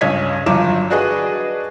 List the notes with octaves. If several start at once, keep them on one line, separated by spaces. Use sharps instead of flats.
C#2 G2 C#4 D#5 G#6 B6
G1 G2 F3 F#3 D6 E7
D4 F#4 G#4 B4 D#5